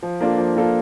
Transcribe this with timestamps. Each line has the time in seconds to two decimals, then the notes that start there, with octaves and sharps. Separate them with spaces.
0.03 F3
0.21 A#3 D4 F4 A4
0.38 F3
0.56 A#3 D4 F4 A4